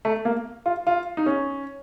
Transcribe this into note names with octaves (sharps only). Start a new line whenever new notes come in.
A3
A#3
F4
F4
D#4
C#4